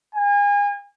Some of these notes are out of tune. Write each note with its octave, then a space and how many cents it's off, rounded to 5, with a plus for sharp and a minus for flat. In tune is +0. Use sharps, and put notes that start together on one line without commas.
G#5 -35